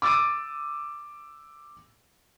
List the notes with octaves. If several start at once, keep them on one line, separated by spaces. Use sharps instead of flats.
D6 E6 A6 D7 D#7